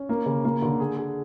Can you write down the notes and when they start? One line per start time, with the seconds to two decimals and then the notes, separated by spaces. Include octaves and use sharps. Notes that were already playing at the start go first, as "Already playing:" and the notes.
Already playing: C#4
0.09 A#3
0.26 C#3
0.45 A#3
0.62 D3
0.80 G#4
0.97 G#4